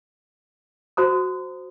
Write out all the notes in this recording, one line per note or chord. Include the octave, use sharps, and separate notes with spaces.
F#4 C5 A#5 D#6